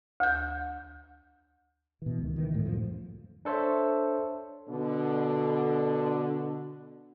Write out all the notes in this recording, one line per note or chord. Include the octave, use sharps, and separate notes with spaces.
D2 G6
B2 E3
C#2 D#3
D#3 E3
A2 D#3
C#2 F#2 A2 F3
D4 A4 C5 C#5 E5
B2 D3